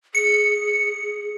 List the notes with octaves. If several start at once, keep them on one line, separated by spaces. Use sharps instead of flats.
G#4 C#7